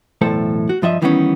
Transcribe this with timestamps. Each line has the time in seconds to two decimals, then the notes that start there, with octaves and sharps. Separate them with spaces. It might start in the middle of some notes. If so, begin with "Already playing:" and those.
0.21 B1 E2 A2 A4 C5
0.69 F#4
0.82 G2 F3 D#5 E5
1.02 D#3 E3 G3 A#3 B3 C#4